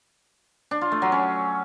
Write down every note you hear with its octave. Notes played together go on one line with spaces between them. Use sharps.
D4
F4
A3
F#3
C#4